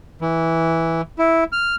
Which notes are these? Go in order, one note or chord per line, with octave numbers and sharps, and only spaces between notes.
E3
E4
F6